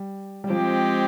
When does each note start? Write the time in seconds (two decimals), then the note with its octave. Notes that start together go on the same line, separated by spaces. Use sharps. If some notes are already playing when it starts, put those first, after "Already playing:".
Already playing: G3
0.44 G3
0.50 F3 G#3 C4 G4